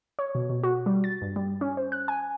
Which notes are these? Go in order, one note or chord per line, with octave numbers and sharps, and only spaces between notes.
C#5
B2
B2
F#4
G3
A6
G2
G3
C#4
C5
F#6
G#5